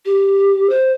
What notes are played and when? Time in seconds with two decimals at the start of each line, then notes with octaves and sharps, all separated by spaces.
0.06 G4
0.70 C5